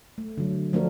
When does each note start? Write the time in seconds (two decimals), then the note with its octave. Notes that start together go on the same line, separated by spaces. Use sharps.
0.18 A3
0.38 D3 F#3
0.73 F3 A3 D4 F#4 A#4